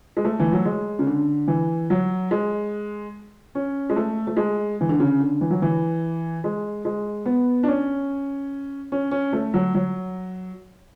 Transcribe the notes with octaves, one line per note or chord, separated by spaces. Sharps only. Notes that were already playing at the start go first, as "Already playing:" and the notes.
G#3
A3
E3
F#3
G#3
C#3
D3
E3
F#3
G#3
C#4
G#3
A3
A3
G#3
E3
D3
C#3
D3
E3
F#3
E3
G#3
G#3
B3
D4
C#4
C#4
C#4
A3
F#3
F#3